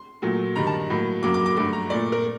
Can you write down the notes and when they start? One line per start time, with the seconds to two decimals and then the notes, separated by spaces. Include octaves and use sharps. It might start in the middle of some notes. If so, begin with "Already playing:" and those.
Already playing: C6
0.22 A#2 F#3 A3
0.56 G2 D#3 G3 A#5
0.67 A5
0.90 A2 F#3 A#3
1.22 F#2 F#3 A#3 D6
1.34 D6
1.46 D6
1.56 G2 F#3 A3 D6
1.73 A#5
1.90 A#2 A3 D5
2.12 A#4